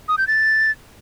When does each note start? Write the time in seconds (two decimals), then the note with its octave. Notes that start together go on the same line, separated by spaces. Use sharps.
0.08 D#6
0.18 G6
0.27 A6